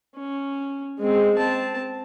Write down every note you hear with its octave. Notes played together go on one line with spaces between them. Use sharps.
C#4
G#3 C4
C4 A5